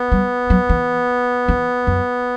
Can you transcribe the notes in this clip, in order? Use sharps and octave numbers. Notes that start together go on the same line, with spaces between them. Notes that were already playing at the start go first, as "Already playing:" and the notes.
Already playing: B3
G3
F#3
E3
E3
F#2